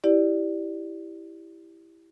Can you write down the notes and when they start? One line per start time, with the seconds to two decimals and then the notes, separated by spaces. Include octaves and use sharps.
0.04 E4 G4 D5